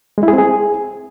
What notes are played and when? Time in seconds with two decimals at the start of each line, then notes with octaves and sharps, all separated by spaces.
0.18 G#3
0.23 E4
0.28 G#4
0.33 C4
0.38 G#4